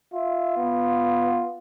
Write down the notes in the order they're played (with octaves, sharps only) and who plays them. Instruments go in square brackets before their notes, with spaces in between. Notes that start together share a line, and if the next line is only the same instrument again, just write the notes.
[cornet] F4 [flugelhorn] E5
[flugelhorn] B3